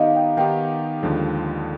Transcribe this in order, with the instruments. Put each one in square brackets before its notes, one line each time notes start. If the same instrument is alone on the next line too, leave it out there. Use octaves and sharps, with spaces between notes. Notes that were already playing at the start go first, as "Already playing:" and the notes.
Already playing: [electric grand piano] D#3 B3 D#4 G4 [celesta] D#5 F5
[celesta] G5
[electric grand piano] D#3 B3 D#4 G4 [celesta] G5
[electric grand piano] D#2 D3 F3 G#3